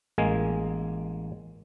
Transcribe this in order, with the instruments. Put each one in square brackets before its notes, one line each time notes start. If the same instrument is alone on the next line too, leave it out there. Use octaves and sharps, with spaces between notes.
[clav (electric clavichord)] A1 G#3 A#3 G#5